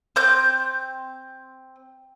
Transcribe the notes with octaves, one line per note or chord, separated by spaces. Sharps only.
C4 G6